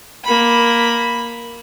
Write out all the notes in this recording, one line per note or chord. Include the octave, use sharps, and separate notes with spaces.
A#3 B5